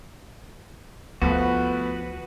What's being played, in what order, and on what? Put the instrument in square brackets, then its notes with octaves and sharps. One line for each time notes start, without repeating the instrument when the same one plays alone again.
[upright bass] D2 [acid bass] F3 [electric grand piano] A3 B3 [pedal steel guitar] F#4 B4